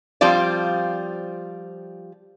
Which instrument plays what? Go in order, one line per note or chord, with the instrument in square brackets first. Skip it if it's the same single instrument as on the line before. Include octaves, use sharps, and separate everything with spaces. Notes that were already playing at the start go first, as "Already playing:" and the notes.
[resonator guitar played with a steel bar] F3 G3 C4 F4 D5